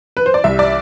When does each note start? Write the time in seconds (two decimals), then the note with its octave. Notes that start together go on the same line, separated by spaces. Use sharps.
0.17 B4
0.26 C5
0.34 D5
0.44 C2 E5
0.59 D5